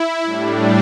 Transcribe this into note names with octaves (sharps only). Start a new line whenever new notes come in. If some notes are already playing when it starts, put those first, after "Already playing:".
Already playing: E4
A2 G3 D4